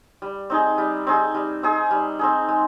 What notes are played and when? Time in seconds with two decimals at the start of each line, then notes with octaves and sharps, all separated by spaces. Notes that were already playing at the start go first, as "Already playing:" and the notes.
0.22 G3
0.50 C4 D#4 G#4
0.78 G3
1.07 C4 D#4 G#4
1.34 G3
1.63 C4 D#4 G#4
1.91 G3
2.19 C4 D#4 G#4
2.48 G#3